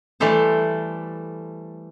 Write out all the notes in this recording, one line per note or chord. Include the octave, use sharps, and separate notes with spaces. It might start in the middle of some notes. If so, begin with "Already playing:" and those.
E3 G3 A3 A4 C5